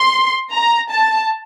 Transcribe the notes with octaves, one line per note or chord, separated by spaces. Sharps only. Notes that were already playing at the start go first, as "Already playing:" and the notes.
Already playing: C6
A#5
A5